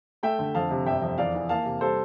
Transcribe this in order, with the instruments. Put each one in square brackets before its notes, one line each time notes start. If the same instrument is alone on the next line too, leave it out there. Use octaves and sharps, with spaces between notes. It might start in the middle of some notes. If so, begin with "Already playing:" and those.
[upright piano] A3 E5 G5
D3
F2 F5 A5
C3
G1 E5 G5
F2
E2 D5 F5
E3
A#3 F5 A5
C3
G3 A4 C5